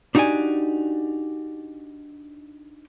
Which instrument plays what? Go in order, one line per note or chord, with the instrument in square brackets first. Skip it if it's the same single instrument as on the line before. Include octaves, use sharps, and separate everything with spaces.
[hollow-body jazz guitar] D4 D#4 F#4 G4 D5 G#5